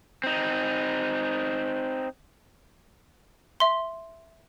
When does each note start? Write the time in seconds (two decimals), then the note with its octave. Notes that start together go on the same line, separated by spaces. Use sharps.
0.24 C4 D#4
3.60 E5 C6